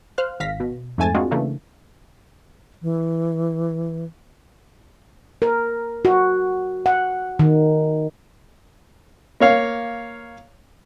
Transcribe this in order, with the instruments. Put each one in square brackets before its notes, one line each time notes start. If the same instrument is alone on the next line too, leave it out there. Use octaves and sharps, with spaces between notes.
[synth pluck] C5 F5 F6 F#6
G#1 F5 A#6 B6
B2
F2 G#2 A3 G#5 A5 A6
G#3 A#3 C4 D4 F4 F#4
C#3 E3 A3 A#3 D4
[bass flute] E3
[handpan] A#4
F#4
F#5
D#3
[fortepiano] A#3 C#5 F5